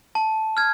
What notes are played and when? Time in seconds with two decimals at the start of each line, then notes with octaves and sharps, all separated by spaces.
0.15 A5
0.57 F6 G#6